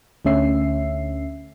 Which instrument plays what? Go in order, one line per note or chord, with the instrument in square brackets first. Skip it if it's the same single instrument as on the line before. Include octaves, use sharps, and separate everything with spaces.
[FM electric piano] D2 D3 A3 C#4 E5 C7